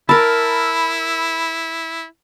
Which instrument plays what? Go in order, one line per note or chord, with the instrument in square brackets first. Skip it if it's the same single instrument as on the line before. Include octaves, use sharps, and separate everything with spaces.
[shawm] E4 [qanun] A#4 A5 [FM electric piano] B5 E6